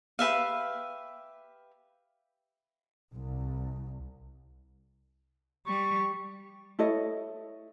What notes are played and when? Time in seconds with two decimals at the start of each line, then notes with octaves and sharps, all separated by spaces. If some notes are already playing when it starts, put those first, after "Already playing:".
0.19 G4 B4 E5 F5
3.13 C2
5.67 G3 C#6
6.79 E4 A4 C#5 D#5